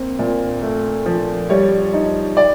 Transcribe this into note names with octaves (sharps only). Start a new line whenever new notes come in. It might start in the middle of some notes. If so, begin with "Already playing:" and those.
Already playing: A#3 C4
A#2
A3
F3
G3 C#5
D#4
D5